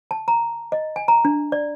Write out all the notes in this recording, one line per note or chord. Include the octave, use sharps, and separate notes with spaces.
A5
A#5
D#5
G#5
A#5
D4
D5